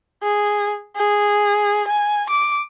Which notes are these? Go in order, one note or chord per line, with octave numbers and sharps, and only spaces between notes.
G#4
G#4
G#5
D6